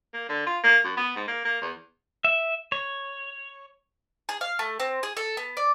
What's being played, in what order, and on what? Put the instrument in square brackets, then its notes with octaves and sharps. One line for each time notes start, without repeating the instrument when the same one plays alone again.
[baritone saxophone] A#3
D3
F4
A#3
F#2
B3
G#2
A#3
A#3
E2
[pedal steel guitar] E5
C#5
[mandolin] G#4
F5
A3
C4
G#4
A4
B3
D5